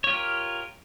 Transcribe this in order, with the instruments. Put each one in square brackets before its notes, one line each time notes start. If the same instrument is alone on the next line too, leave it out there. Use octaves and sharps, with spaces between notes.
[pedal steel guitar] C#5
F4
G4
A#4